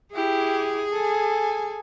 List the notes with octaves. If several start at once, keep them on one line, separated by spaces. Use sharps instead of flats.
E4 G4 G#4
A4 G#5